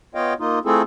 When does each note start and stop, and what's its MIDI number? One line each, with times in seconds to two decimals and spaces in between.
0.15 0.34 59
0.15 0.34 65
0.15 0.34 73
0.15 0.34 75
0.15 0.34 77
0.15 0.34 79
0.40 0.59 58
0.40 0.59 63
0.40 0.59 65
0.65 0.82 57
0.65 0.82 60
0.65 0.82 64
0.65 0.82 65
0.65 0.82 68
0.65 0.82 69